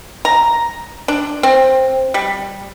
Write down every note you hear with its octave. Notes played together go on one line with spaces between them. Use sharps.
A#5
D4
C4
G3